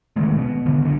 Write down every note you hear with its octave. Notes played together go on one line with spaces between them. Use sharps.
C2 D#3 G#3 A3
B2 A#3 B3
G#1 D3 B3
B1 D3